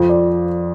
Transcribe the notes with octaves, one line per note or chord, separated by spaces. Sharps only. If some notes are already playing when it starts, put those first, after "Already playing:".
Already playing: F2 F3 C5
D5